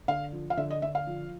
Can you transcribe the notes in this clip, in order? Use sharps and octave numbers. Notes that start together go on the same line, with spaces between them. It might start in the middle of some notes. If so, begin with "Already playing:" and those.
D3 F5
F3
F5
D3 E5
D#5
D3 E5
F5
F3